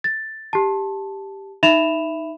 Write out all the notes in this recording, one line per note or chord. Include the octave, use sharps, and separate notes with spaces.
A6
G4 A5
D#4 E5 B5 E7 F7